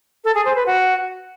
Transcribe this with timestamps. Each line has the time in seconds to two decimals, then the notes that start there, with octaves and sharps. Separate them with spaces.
0.24 A4
0.35 G#4
0.45 C5
0.55 B4
0.66 F#4